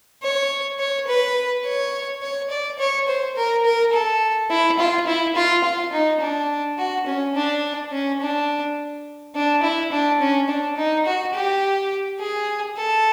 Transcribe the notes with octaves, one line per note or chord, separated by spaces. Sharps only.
C#5
C#5
B4
C#5
C#5
D5
C#5
C5
A#4
A#4
A4
E4
F4
E4
F4
F4
D#4
D4
F#4
C#4
D4
C#4
D4
D4
E4
D4
C#4
D4
D#4
F#4
G4
G#4
A4